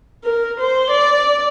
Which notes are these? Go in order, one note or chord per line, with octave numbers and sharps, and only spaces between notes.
A#4
C5
D5